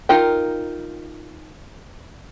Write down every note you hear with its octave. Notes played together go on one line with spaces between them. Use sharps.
D#4 F4 A#4 G5